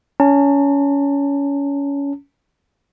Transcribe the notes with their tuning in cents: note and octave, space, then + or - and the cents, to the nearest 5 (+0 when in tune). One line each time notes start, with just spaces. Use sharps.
C#4 +20 A5 +40